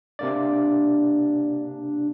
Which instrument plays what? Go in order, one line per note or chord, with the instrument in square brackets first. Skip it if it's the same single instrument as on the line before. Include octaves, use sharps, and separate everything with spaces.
[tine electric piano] C3 A#3 D5 [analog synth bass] D4